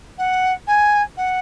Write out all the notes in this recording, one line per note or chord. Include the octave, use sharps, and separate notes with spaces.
F#5
G#5
F#5